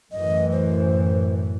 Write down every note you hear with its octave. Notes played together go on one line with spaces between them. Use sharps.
F#2 A2 E3 D#5
C5